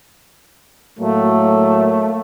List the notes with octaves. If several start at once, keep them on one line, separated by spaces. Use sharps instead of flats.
A2 F#3 A3 A#3